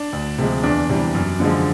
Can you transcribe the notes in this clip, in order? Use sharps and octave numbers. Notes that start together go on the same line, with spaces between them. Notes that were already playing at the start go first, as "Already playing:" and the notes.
Already playing: D4
D2
C3 F3 G#3
E2 D4
C3 E3 G3
F#2
D3 F3 G#3